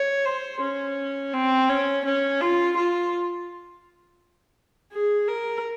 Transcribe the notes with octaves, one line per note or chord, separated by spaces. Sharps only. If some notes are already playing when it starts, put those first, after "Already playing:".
Already playing: C#5
C5
C#4
C4
C#4
C#4
F4
F4
G#4
A#4